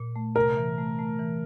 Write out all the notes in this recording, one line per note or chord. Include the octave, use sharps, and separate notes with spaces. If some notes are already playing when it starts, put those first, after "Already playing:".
Already playing: A#2
A3
C3 A#4
E3
A3
A3
E3